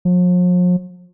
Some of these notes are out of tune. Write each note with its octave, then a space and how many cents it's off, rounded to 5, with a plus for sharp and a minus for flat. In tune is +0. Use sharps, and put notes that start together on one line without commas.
F3 +45